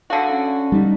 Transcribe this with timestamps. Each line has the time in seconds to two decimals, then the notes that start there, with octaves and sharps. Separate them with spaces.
0.10 D3 F#4 F5
0.31 C#4
0.72 G3 D#4